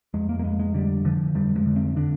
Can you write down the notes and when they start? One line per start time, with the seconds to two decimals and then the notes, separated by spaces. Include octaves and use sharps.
0.14 F2 G#3
0.29 A#3
0.39 A#3
0.44 F2 G#3
0.59 G#3
0.74 D3 G3
1.05 D3 F3
1.35 F2 G3
1.56 G#3
1.66 D3
1.76 C4
1.96 D3 D4